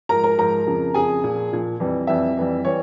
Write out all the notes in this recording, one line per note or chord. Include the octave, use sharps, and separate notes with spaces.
G#2 F3 A#4 A#5
A#4 A#5
G#2 F3 A#4 A#5
F2 C#3 F3
F2 C#3 F3 G#4 G#5
A#2 F3
A#2 F3
F2 E3 G3
F2 E3 G3 E5
F2 E3 G3
E3 G3 C#5